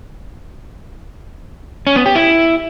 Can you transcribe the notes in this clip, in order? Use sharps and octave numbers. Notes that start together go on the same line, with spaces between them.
C#4
B3
G4
E4